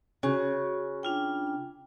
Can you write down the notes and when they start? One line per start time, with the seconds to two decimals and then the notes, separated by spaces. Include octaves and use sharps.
0.23 C#3 C#4 F#4 C#6
1.03 D4 F4 G5